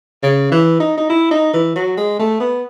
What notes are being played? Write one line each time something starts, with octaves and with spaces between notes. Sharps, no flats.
C#3
E3
D#4
D#4
E4
D#4
E3
F#3
G#3
A3
B3